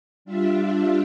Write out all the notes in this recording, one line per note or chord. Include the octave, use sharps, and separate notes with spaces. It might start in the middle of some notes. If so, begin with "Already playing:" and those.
G3 D4 F4 E5